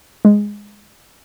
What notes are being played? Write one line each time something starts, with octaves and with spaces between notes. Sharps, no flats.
G#3